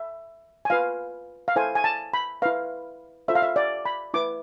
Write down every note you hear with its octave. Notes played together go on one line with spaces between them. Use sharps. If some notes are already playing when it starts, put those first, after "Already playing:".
Already playing: E5
G#5
F4 B4 F5
F5
E4 A4 C5 G#5
G#5
A5
B5
E4 B4 F5
F4 A4 C5 E5
F5
E5
D5
B5
E4 B4 D6